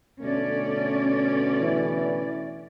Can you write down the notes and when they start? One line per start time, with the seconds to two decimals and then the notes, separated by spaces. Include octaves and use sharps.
0.22 B2 D3 A3 C#4 D5
1.61 E3